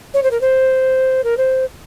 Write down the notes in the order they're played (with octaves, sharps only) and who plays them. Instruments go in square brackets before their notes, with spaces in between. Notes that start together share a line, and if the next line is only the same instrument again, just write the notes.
[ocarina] C#5
C5
A#4
C5
A#4
C5